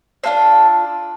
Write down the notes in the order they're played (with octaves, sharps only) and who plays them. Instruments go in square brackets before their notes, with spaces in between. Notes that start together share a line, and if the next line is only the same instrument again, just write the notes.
[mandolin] D4 F4 A4 C5